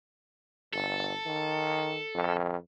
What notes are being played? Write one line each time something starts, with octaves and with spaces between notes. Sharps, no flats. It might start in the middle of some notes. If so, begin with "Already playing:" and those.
G1 A4
D#3
F2